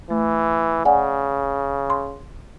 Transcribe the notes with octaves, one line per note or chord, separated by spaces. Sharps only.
E3 A3
C#3 D5 F#5 G#5
C6